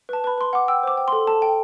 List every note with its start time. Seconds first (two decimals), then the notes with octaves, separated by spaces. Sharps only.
0.09 B4 A5
0.24 B4 B5
0.38 B4 C6
0.53 F#5 D6
0.68 G5 E6
0.83 C5 D6
0.97 G5
1.08 A4 C6
1.27 A4 A5
1.42 G5